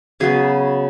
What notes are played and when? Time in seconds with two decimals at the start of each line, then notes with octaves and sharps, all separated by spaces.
0.20 C#3 F#3 B3 G#4